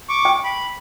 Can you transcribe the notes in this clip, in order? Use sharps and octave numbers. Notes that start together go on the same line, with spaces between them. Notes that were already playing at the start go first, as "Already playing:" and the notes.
C#6 D6
G5
B5